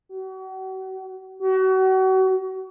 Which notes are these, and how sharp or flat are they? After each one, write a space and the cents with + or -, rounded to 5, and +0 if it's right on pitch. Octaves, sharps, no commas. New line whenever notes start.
F#4 +40
F#4 +35